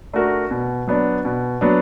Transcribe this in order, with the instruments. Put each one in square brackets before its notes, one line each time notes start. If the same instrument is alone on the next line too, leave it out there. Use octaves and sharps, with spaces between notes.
[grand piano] A3 D4 F#4 A#4
B2
F#3 B3 D4
B2
F#3 B3 D4